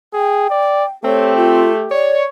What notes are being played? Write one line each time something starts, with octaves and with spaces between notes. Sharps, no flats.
G#4 G5
D5
A3 C4 G4 C#5
F4
C#5 D5